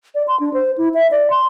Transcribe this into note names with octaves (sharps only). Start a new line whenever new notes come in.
D5
C6
D4
C5
E4
E5
D5
C6